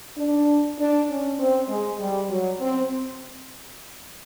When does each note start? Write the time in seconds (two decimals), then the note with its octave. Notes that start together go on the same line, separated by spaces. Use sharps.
0.17 D4
0.78 D4
1.09 C#4
1.39 C4
1.69 G#3
1.99 G3
2.30 F#3
2.61 C4